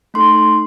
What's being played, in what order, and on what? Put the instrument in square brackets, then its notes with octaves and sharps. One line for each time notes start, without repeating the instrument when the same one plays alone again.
[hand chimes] A3 D#4 A4 C6